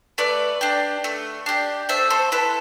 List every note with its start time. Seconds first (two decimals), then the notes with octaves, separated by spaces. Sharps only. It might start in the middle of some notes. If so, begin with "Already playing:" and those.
0.18 A3 B4 D5
0.61 D4 G4
1.04 A3
1.46 D4 G4
1.89 A3 C5 E5
2.10 A4 C5
2.32 E4 A4 B4